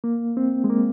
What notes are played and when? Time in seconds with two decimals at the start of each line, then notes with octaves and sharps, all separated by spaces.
0.04 A#3
0.37 C4
0.64 G#3
0.70 A#3